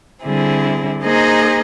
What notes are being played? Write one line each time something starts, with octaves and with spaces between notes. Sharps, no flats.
D3 G3 C4 E4 G#4
A#3 D#4 G#4 C5 D#5